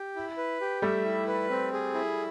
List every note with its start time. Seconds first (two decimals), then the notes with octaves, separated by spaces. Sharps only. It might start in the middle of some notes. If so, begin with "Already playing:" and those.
Already playing: G4
0.16 E4
0.37 B4
0.61 G4
0.82 G3 A3 E5
1.05 E4
1.27 B4
1.50 C4
1.73 G#4
1.94 E4